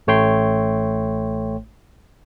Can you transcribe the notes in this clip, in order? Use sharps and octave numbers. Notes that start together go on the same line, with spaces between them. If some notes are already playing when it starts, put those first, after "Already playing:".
A1 A3 C#5 G5 C6